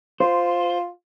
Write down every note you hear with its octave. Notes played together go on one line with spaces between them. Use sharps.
F4 C5